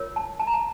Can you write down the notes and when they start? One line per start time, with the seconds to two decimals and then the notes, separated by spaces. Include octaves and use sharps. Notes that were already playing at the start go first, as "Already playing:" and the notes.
Already playing: F4 A#4 C#5
0.16 A5
0.40 A5
0.47 A#5
0.54 A5